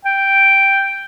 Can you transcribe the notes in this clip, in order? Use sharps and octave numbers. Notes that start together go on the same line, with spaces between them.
G5